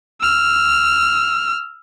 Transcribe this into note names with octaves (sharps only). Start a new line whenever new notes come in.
E6 F6